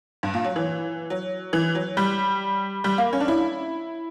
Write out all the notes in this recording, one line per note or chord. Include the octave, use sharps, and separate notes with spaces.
G2
A#2
F#3
E3
F#3
E3
F#3
G3
G3
A#3
C#4
D4
E4